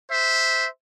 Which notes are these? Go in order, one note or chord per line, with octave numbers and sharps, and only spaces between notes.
C5 E5